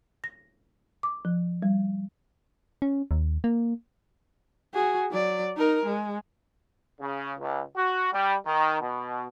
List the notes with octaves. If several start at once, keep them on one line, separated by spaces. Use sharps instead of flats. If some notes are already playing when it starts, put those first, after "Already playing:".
A#6
D6
F3
G3
C#4
D#2
A#3
F#4 G#4
F#3 D5
D#4 A#4
G#3
C#3
C#2
F#4
G3
D#3
B2